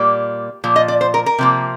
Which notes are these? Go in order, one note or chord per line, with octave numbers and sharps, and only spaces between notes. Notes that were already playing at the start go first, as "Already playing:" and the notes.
Already playing: A#2 G3 A#3
A#2 F3
D#5
D5
C5
A#4
A#4
C3 F3 A#3